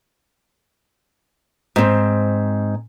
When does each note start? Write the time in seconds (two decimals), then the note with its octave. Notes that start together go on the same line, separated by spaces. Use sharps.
1.76 G#2 C4